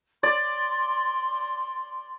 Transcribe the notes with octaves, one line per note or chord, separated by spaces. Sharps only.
D5 C6